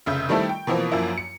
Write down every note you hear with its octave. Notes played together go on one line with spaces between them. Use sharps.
F1 C#3 E5 G6
D#3 G3 A3 C4 E4 A4
G5
B2 E3 F3 A#3 C4
F#2 F3 A#3 E4
C#7